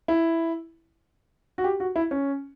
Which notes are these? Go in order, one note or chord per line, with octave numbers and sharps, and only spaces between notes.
E4
F#4
G4
F#4
E4
C#4